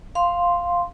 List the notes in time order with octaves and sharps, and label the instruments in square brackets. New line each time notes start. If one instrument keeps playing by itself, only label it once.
[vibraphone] F5 C6